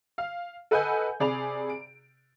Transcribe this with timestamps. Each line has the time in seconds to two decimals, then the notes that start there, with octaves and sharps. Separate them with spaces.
0.18 F5
0.71 A4 B4 D#5 F#5 G#5 G6
1.20 C3 G#4 D5 B5 F7
1.70 D7